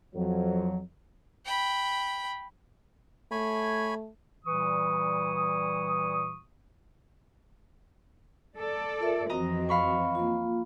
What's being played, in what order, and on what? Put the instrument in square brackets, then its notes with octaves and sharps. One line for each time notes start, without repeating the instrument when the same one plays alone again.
[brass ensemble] F2 F#3
[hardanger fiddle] G5 B5
[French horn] A3 [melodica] C#5 G#5 B5
[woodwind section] A#2 E3 G3 C#6 D#6
[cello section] A4 D5
[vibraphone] F4 A#4 E5
[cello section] F2 E3 C4 [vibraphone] F#4 [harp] D#5 A#5
[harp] F5 B5 C#6
[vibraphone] A#3 F4